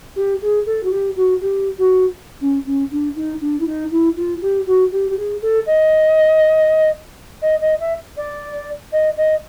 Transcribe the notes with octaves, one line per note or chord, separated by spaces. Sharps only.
G4
G#4
A4
F#4
G4
F#4
G4
F#4
C#4
C#4
D4
D#4
D4
E4
D#4
E4
F4
G4
F#4
G4
G4
G#4
A4
D#5
D#5
D#5
E5
D5
D#5
D#5